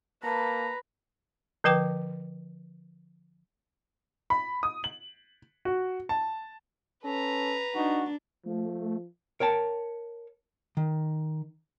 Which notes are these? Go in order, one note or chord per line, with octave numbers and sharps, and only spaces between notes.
A#3 B4 A5 A#5
D3 F3 B4 G5 D6
B5
D#6
F#7
F#4
A5
C#4 A4 B4 A#5
D4 D#4 F#4
F3 A3
A#4 C#5 G5 A5
D#3